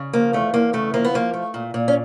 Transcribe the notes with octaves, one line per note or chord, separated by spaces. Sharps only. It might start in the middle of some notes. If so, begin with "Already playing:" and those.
Already playing: C#3
F3 A#3
E2 A3
E2 A#3
C#3 A3
F3 A#3
B3
F3 A#3
A3
A#2
A#2
C#4